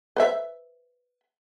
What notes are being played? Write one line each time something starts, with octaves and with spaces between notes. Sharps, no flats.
B4 C5 E5